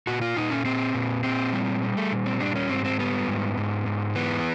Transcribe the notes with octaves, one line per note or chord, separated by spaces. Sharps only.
A#2 F#4
F4
A#2 D#4
C#4
A#2 C4
A#2
A#2 C4
G3
G3
A3
A#2
C4
G3 D4
C#4
G#2 C4
C4
G3 B3
G#2
G#2
G#2
E3 B3